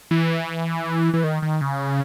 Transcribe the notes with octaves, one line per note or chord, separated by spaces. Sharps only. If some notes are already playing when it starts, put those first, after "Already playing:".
E3
E3
D#3
D#3
C#3